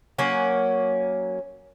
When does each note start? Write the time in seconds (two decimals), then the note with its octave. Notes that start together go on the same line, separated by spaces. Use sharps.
0.18 F#3 A#3 C#4 F#5